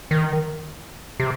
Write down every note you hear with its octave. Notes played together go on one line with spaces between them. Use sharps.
D#3
C3